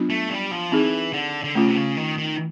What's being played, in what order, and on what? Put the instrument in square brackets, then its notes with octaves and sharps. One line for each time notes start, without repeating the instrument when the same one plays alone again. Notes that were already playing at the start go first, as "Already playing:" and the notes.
Already playing: [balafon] F#3 B3 D4 F4
[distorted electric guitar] A3
G3
F3
[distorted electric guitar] E3 [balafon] C4 D#4 G#4
[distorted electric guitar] D3
D3
[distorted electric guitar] C#3 [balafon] A3 C#4 F4
[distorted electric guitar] C3
C#3
D#3
D#3